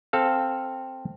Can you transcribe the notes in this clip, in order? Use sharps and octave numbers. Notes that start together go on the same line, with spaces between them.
C4 A4 F5